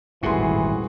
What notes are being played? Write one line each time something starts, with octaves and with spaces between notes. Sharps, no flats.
D#1 G#1 A2 E3 F#4 G#4 C6